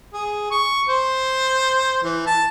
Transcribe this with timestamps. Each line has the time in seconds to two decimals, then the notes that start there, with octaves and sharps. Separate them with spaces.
0.13 G#4
0.51 C#6
0.88 C5
2.03 E3
2.27 A5